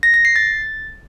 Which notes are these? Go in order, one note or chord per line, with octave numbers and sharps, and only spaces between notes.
A#6
A#6
C7
A6